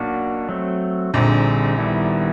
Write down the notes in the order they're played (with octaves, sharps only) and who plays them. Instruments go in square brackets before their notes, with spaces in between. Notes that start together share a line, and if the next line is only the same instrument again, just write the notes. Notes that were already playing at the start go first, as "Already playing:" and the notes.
Already playing: [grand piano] B1 B2 [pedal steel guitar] A#3 D4 F#4
[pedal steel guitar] F#3 A3 C4
[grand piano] A#1 A#2 [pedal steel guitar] D3 G3 C4 D#4 G#4
[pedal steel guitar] D#3 G3 B3 E4 A4